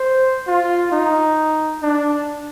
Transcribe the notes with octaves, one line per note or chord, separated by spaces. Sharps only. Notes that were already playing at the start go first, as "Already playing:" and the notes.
Already playing: C5
F4
D#4
D4